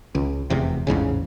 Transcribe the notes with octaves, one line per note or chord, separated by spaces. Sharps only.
C#2
F1 E2 C3
A1 E2 G#2 C#3